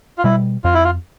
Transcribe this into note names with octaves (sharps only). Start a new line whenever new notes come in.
F4
B2 G3 E4
F2 F4
E4
F4